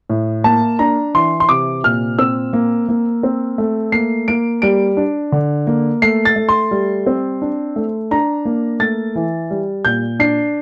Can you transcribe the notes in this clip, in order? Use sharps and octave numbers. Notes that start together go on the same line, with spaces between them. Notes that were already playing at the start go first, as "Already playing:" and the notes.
A2
A#3 A5
D4 A#5
E3 C6
C6
C3 D6
A#2 F6
C4 E6
A#3
A#3
C4
A3
A#3 C7
A#3 D7
G3 D7
D4
D3
A#3
A3 C7
A6
A3
C6
G3
C4
D4
A3
D4 A#5
A#3
A3 A6
E3
G3
A#2 G6
D4 C7